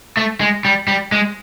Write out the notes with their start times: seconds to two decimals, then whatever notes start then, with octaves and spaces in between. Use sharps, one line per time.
0.17 A3
0.41 G#3
0.65 G3
0.88 G3
1.12 G#3